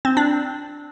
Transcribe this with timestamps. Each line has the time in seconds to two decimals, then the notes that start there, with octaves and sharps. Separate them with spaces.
0.05 C4
0.17 D4